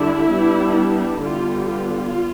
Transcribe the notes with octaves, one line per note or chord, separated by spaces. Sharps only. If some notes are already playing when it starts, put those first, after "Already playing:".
Already playing: D3 G3 D4 E4
G3 B3 D4
D3 G3 B3 F4
F4